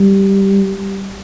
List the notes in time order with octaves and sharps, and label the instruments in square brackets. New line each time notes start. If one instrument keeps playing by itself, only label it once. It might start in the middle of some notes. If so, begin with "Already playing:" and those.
Already playing: [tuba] G3